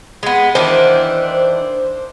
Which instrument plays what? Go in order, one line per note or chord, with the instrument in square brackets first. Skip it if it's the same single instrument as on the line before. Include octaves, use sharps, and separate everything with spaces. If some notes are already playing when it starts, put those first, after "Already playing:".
[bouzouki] G#3 B3
[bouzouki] D#3 E3 D4 [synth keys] C5